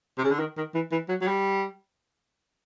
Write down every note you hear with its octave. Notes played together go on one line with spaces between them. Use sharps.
C3
C#3
D3
D#3
D#3
E3
E3
F#3
F#3
G3